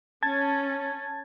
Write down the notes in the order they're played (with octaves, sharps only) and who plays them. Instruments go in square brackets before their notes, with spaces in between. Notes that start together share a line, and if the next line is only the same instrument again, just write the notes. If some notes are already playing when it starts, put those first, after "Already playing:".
[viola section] C#4 [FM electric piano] A5 G#6 A6